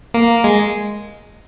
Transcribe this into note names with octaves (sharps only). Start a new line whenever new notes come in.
A#3
G#3